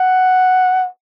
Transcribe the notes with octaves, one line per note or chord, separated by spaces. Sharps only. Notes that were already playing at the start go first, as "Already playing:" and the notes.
Already playing: F#5